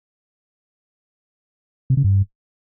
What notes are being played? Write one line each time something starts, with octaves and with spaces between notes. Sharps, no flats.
C3
C#3
G2